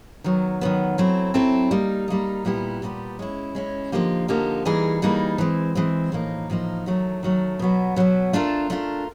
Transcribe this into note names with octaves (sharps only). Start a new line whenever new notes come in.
D#3 F#3 B3
D#3 F#3 B3
F#3 A3 C4 E4
F#3 A3 C4 E4
G3 A#3 D#4
G3 A#3 D#4
A#2 G3 B3 E4 G4
A#2 G3 B3 E4 G4
G#3 C#4 E4
G#3 C#4 E4
D3 F3 A#3 D#4 G4
D3 F3 A#3 D#4 G4
E3 G3 A#3 D#4 G#4
E3 G3 A#3 D#4 G#4
E3 G#3 C4
E3 G#3 C4
A2 F3 A#3 D#4
A2 F3 A#3 D#4
D#3 F#3 A3
D#3 F#3 A3
B2 F#3 B3
B2 F#3 B3
A3 D4 F4 A#4
A3 D4 F4 A#4